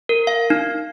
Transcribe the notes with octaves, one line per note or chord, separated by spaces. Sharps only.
A#4
F5
D#4